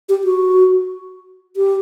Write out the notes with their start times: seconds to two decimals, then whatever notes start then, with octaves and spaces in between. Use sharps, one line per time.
0.09 G4
0.24 F#4
1.56 G4